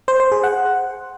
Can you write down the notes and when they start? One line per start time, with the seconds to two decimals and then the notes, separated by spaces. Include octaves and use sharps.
0.08 C5
0.20 C5
0.32 G#4
0.43 F#5